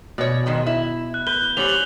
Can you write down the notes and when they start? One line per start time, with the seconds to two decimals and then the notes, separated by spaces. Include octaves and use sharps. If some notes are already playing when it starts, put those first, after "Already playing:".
0.18 B2 C#5 D5
0.46 G#2 D#3 G#3
0.66 E4
1.14 F#6
1.27 B4 F#6 G6 G7
1.57 F#3 G3 C#4 C5 F7 F#7